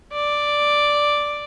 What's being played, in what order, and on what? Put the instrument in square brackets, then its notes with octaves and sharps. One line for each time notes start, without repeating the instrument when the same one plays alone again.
[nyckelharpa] D5